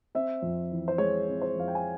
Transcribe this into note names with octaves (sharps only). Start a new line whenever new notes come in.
C4 E5
F2
E3
C5
G#3 C#5
C4
C5
F2 F5
G5
G#5